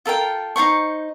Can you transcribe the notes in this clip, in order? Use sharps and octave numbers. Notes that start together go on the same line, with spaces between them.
F4 A4 A#4 G5
D#4 F4 C5 C#6